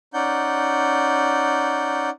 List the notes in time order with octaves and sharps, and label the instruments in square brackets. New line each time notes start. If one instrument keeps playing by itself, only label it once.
[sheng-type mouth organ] C#4 D#4 D5 F#5 G6